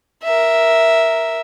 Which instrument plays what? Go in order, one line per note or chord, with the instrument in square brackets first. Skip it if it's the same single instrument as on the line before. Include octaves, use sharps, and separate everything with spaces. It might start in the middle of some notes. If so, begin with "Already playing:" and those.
[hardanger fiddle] A#4 E5